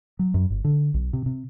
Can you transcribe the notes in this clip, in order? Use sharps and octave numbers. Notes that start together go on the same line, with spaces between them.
F#3
F#2
G1
D3
B1
C3
C3